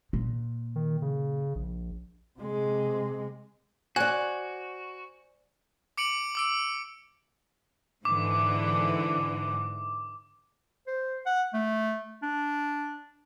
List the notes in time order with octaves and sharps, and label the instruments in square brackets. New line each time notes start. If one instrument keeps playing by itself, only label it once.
[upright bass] A#2
[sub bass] D#3
C#3
A#1
[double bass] C3 G#3
[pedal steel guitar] F#4 [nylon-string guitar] C5 D5 [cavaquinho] G#5 [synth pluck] F#6
[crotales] D6 C#7 D7 F#7
D6 E6 D7
[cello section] G#2 D3 E3 [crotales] D6
[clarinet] C5
F#5
A3
D4